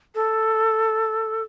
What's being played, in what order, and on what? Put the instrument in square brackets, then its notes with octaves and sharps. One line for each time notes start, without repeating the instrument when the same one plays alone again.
[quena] A4